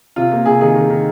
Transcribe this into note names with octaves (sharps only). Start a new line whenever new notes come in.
C3 F4
A#3
C3 G#4
D#3 G#4
D#3
D#3